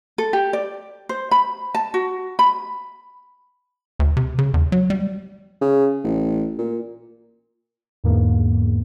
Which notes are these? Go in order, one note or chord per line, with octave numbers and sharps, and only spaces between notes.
A4
G4
D5
C5
B5
A5
F#4
B5
D2
C3
C#3
E2
F#3
G3
C#3
A1
A#2
E2 G#2 D3 A#3 B3